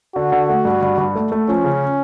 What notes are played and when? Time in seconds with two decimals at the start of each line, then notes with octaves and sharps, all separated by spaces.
0.15 D3 F#4
0.32 D3
0.49 A3
0.65 G2
0.82 G2
0.98 G2
1.15 A3
1.32 A3
1.48 F3 C#4
1.64 C#3